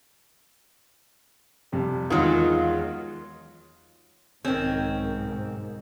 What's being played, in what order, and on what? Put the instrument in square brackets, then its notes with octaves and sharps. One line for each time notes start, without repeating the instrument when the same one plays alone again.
[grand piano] F2 C3 G3
[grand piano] E2 G#3 G#4 [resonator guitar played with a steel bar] D#3 F#3 [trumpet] F4
[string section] B1 G#2 [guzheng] D#3 C#4 [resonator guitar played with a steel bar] C4